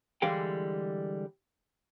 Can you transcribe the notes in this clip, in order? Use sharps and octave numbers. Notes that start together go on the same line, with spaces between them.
D3 E3 G3 G#3 F5 G5